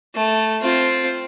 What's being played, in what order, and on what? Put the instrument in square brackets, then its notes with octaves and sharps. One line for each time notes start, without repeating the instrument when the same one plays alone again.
[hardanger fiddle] A3
C4 F4